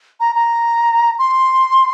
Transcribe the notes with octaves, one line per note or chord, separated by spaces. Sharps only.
A#5
A#5
C6